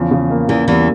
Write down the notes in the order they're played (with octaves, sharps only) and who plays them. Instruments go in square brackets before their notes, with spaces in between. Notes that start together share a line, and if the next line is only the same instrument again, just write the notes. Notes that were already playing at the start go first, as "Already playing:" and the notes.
Already playing: [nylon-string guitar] E2 E3 [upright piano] C#3 F3
[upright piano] C#3
A#3
[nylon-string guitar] E2 E3 [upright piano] C#3
[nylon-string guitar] E2 E3 [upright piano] G3